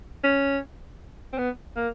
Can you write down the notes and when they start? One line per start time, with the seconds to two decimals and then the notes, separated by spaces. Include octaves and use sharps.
0.24 C#4
1.33 C4
1.38 B3
1.77 A#3